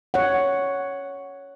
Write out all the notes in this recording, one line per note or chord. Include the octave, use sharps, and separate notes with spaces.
C#5 F#5